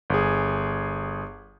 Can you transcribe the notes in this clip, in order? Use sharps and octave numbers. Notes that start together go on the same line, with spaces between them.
G1 G#4